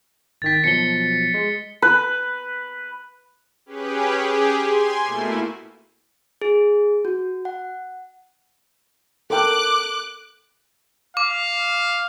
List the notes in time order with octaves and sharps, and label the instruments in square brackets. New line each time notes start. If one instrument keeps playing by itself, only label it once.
[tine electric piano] G#1 D#3 G5 [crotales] A6 B6
[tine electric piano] B2 F3 F#3 [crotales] C#7 G7
[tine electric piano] G#3
[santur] B4
[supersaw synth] C#4 G4 G#4 B4
G4 G#4
G#5 C6
B2 A3 A#3 E4
[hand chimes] G#4
F#4
F#5
[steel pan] A4 A#4 G5 [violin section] D6 F#6
[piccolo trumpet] F5 [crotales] D6